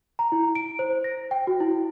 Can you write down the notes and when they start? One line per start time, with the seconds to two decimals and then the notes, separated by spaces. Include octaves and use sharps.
0.19 A#5
0.32 E4
0.55 D7
0.79 C5
1.04 A#6
1.31 G5
1.47 F#4
1.60 E4